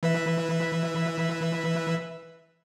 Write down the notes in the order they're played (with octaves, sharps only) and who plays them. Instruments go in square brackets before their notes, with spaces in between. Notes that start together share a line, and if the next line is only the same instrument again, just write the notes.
[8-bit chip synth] E3 B4 E5